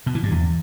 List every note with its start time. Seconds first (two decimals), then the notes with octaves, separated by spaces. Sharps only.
0.06 B2
0.15 E3
0.23 G2
0.32 E2